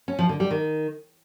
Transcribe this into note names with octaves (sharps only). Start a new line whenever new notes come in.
C#4
F3
D3
G3
D#3